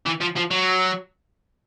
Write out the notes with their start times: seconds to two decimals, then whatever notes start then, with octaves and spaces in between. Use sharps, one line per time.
0.06 E3
0.21 F3
0.36 F3
0.51 F#3